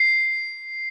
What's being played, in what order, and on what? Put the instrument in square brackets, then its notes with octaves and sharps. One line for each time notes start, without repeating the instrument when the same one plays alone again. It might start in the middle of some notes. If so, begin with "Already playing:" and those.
Already playing: [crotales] C7